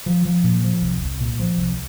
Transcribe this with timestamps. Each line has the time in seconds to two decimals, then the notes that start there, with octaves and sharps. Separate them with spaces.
0.06 F3
0.25 F3
0.44 A#2
0.63 F3
0.82 C2
1.02 C2
1.20 A#2
1.39 F3
1.58 C2